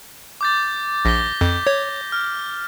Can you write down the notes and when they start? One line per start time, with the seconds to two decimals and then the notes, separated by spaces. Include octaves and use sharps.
0.41 D6 G6 A6
1.05 A#1 A#6 B6 G7
1.41 F2 G6
1.67 C#5
2.12 F6